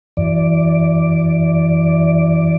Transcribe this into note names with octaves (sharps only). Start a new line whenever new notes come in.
F#2 E3 D5